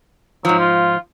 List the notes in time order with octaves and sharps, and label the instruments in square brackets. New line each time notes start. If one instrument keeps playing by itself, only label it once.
[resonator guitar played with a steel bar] G#2 F3 [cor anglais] F#3
[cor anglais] F4